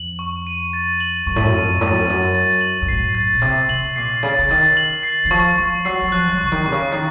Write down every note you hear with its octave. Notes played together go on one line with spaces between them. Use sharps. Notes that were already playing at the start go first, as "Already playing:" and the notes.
Already playing: F2 F#7
C#6
D#7
A6
F#7
F#2 C#6
A2
F#2
F2 D#7
A2 A6
F#2
F2
F#2 A6
A6
F#7
F#2
A2 C7
A6
A#2
C3 A6
C3 F#7
A#2 C7
C#3 A6
C#3
D#3 A6
F#7
C7
D#3
F3 C#6
F3 C#6
F#3 C7
F#3
F3 F#6
D#3
F3
C#3 C#6
D#3
C3 C#6
C#3
D#3 C7